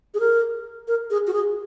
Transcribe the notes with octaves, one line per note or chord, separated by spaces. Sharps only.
G#4
A#4
A#4
G#4
F#4
G#4